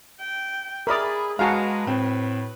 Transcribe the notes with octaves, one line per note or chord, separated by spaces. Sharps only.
G5
G#4 A#4 D5 E5 B5 D#6
G#3 F#4 G#4 B4 F5 A5 A#5
A2 C4